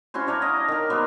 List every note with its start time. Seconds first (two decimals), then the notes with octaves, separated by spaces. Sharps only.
0.14 C#4 E4 F#4 C5
0.27 D4 C#5 F5 A#5
0.42 D#5 A#5
0.57 D4
0.68 D#3 A#4
0.90 F#3 A#3 B3 C5